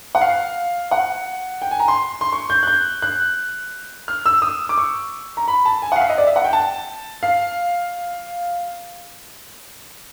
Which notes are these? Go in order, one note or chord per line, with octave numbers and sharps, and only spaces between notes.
F#5
F5
F#5
G5
G#5
A#5
C6
C6
C#6
G6
F#6
G6
F#6
F6
E6
D#6
D6
C#6
A#5
B5
A5
G#5
F5 F#5
E5
D#5
D5
E5
F#5
G5
A5
F5